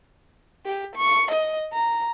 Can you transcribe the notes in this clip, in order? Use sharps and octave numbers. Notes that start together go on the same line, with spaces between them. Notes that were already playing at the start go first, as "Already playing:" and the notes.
G4
C#6
D#5
A#5